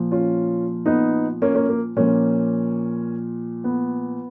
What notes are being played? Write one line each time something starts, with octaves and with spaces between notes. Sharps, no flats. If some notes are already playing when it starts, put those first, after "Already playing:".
Already playing: A#2 F3
C#4 F4
B3 D#4
A#3 C#4
A#3 C#4
A#3
A#2 F3 A#3 C#4
B3